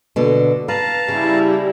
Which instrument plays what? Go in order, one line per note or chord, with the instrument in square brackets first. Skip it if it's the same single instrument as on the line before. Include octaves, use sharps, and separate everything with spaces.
[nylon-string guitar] B2 D3
[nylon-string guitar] B4 [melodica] F5 A5 A#5
[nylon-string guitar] C#3 [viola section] G3 E4